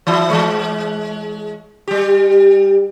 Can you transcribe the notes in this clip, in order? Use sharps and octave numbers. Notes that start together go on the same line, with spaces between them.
E3 E4
E3 G#3
G3 G4